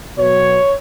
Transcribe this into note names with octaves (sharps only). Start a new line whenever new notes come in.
B2 F#3 C#5